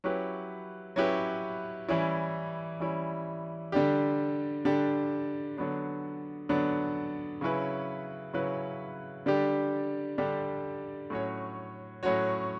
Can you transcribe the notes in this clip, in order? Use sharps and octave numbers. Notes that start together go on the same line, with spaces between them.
F#3 C#4 E4 G4 B4
F#3 C#4 E4 G4 B4
E3 G3 C#4 E4
E3 G3 C#4 E4
D3 G3 D4 G4
D3 G3 D4 G4
D3 F#3 B3 D4
D3 F#3 B3 D4
C#3 F#3 C#4 E4 B4
C#3 F#3 C#4 E4 B4
D3 G3 D4 G4
D3 G3 D4 G4
A2 F#3 C#4 F#4 C#5
A2 F#3 C#4 F#4 C#5